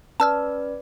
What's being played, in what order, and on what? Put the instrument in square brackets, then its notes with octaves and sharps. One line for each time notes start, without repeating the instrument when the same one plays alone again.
[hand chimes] C#4 B4 D5 [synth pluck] A5 E6 F6